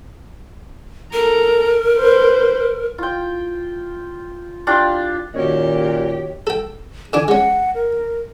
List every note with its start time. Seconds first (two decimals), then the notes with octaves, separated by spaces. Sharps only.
1.13 A4 A#4 A#5
1.95 B4 C5
2.98 F4 G5
4.67 D4 F4 G4 G5
5.34 A#2 D#3 C#4 F#4 G4 C#5 D#5
6.47 A4 G5
7.13 D3 D4 G#5 D6
7.28 G#3 C#4 F#5
7.74 A#4